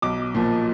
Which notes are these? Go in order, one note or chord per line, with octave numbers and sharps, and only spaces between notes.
B1 D6
A#2 F3